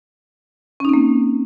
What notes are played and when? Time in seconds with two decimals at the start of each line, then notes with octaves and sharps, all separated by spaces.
0.80 C#4
0.85 D#4
0.89 C4
0.94 A#3